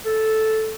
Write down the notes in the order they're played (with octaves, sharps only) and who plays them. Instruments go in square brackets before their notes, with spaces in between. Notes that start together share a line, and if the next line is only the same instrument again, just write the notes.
[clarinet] A4